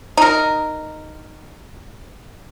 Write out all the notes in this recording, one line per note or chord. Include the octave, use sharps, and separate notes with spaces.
D#4 A#4